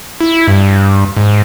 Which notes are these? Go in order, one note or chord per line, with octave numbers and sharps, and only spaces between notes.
E4
G2
G#2